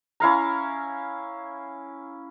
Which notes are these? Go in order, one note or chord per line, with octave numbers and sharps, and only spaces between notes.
C#4 E4 F5 A#5